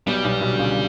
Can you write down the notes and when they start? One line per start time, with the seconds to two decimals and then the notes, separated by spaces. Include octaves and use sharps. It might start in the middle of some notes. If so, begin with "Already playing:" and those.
0.07 B1 B2 G3
0.24 B1 B2
0.41 B1 B2
0.52 D3
0.58 C#2 C#3